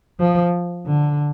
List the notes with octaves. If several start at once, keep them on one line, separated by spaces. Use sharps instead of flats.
F3
D3